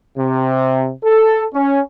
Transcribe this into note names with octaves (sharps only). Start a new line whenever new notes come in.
C3
A4
C#4